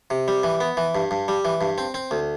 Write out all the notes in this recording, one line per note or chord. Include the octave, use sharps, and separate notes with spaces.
C3
G3
E3
B3
E3
G2
G2
G3
E3
G2
C4
C4
D2